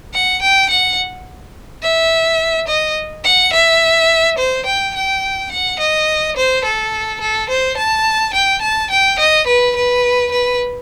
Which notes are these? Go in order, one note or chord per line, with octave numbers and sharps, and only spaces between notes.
F#5
G5
F#5
E5
D#5
F#5
E5
C5
G5
G5
F#5
D#5
C5
A4
A4
C5
A5
G5
A5
G5
D#5
B4
B4
B4